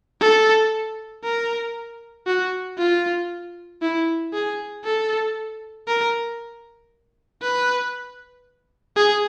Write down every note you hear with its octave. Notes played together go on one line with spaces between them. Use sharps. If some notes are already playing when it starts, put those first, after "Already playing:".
A4
A#4
F#4
F4
E4
G#4
A4
A#4
B4
G#4